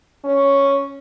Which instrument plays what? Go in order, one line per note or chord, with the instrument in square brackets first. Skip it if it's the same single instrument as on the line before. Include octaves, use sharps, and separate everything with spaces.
[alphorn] C#4